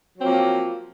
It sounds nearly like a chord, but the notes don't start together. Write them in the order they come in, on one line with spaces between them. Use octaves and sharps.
F#3 C4 F3 A#3